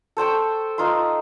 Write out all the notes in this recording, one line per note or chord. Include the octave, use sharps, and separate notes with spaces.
A4 C5 G5 C#6
D#4 F4 B4 C6